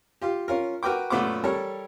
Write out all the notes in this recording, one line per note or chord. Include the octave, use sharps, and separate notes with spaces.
F4 G4
C#4 F4 A#4
F#4 A#4 B4 G5 D6
F#2 A#2 A3 B3 F4 D6
G3 A4 A#4 C#5